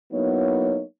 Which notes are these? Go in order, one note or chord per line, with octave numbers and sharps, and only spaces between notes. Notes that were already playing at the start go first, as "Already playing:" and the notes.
F#3 A#3 B3 D#4 E4 C#5